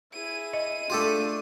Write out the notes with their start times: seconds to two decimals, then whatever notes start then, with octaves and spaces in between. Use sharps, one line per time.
0.14 E4 G#4 D#7
0.53 D#5
0.90 A3 D4 F4 G4 A4